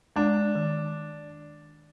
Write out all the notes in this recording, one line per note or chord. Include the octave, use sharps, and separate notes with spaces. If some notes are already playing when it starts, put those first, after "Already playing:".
G#3 D4
D#3